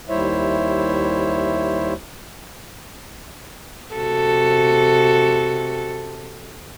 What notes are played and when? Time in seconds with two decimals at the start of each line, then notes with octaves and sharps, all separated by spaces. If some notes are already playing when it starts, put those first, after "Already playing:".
0.09 D#2 G3 E4 C5 C#5 E5
3.95 C3 F#4 A4